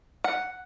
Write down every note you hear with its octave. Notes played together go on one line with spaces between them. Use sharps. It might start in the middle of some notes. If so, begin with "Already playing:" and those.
F#5